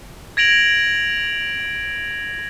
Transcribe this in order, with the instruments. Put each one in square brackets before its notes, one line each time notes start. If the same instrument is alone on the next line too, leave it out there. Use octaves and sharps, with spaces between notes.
[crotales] G#6 A#6 D7 F7 F#7